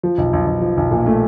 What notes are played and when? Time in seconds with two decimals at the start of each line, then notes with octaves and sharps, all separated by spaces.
0.03 F3
0.18 B1
0.33 B1
0.47 B1
0.61 F3
0.77 B1
0.91 A#2
1.06 A3